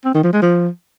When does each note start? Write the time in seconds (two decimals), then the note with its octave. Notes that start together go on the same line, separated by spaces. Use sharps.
0.05 C4
0.14 D#3
0.24 F3
0.33 G#3
0.42 F3